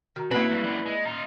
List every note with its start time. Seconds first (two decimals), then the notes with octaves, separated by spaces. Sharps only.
0.16 D#3 F#4 A#5
0.31 C#3 A#3 C4 E4 B4
0.50 D2 G2
0.64 F#2 E3 D5 B5
0.86 G#3
1.05 D#4 F4 A#5